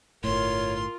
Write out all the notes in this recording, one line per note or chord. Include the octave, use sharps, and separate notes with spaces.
G1 A2 F4 A#4 C#5 C6